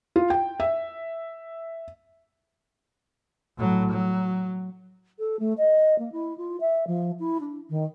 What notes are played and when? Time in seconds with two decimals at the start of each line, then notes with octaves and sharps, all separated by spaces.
0.16 F4
0.30 G5
0.60 E5
3.58 A2 F#3
3.91 F#3
5.18 A4
5.39 A3
5.57 D#5
5.98 A#3
6.11 E4
6.37 F4
6.60 E5
6.87 F3
7.19 E4
7.40 D4
7.69 D#3